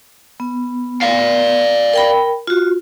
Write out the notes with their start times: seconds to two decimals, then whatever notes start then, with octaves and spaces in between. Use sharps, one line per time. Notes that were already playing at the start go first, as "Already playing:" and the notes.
0.40 B3
1.02 D5 F5
1.94 A#4 G5 B5
2.47 F4 F#4